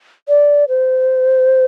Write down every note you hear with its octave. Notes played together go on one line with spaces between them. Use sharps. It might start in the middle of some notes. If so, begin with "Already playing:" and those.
D5
C5